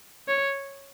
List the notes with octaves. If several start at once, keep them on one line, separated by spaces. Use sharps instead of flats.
C#5